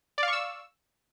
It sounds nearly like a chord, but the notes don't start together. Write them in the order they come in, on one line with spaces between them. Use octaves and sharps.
D5 F5 C#6 E6